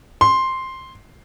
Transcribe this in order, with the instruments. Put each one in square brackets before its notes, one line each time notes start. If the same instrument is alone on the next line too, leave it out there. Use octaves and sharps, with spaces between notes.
[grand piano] C6